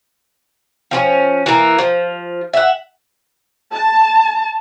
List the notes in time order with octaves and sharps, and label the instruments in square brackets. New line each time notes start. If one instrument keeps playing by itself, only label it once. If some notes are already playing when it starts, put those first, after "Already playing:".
[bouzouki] F3 C4 C#4
E3 A#3
F3
E5 F#5
[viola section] A5